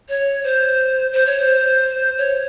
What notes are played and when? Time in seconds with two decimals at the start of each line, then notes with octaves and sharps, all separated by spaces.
0.09 C#5
0.44 C5
1.13 C5
1.26 C#5
1.40 C5
2.18 C#5